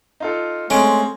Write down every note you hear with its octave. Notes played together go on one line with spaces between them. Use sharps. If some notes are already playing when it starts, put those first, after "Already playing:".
D#4 F4 A4
G#3 A3 C4 C#4 D7